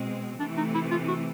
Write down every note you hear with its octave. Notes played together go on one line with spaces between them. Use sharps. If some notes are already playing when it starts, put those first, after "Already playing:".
Already playing: B2 G#3 C4
C3 E3 A3 D4
D#4
E4
F4
F#4